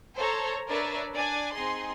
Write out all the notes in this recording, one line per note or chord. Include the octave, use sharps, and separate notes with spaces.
A4 C5 C#5 A#5
D4 A#4 B4 C#5 D5 E5
D4 D5 G#5
C4 D#4 G#4 C6